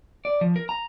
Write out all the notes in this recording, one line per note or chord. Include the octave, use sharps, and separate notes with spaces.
D5
F3
A#4
A#5